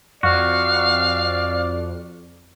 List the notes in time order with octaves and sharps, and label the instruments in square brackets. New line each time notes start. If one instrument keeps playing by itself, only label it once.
[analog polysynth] F2 [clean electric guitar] F#4 [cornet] D5 [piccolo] F5